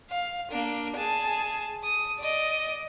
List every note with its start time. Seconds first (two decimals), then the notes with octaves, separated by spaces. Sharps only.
0.10 F5
0.51 A#3 D4
0.96 G#4 A5
1.83 D#6
2.19 D5 D#5